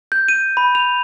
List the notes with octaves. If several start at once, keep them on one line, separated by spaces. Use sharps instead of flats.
G6
D#7
B5
F7